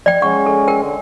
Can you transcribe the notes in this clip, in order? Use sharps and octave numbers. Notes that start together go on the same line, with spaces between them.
D5 G5
G#3 C#4 F#5 C#6
A4
A#4 G5
D3